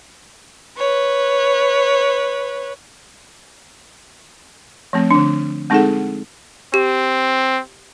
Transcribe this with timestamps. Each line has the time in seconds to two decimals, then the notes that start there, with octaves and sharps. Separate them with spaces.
0.77 B4 C#5
4.93 F3 A3 C4
5.11 D3 D4
5.70 G#3 C4 D#4 G#4 A4 F#5
6.74 C4 G4